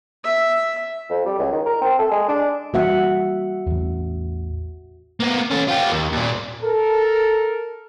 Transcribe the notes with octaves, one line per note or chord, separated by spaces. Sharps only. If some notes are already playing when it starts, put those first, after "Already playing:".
E5
F2
G3
C#2
D#3
A#4
C4
A4
G#3
D4
E3 G3 A#3 F#4 E5 F#5
A1 E2
A#3 B3
C#4 A4
F4 G4
D#2
D#2 A#2
A4 A#4